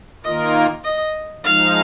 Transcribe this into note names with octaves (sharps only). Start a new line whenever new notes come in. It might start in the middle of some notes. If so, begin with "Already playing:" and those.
D#3 A#3 F4 A#4 D#5
D#5
F3 G#3 D#4 F5